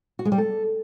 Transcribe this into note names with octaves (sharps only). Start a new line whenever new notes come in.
F#4
G#3
G3
A4